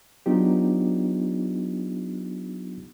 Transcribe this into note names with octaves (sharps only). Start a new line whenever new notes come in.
F#3 B3 D4 D#4 F4 G4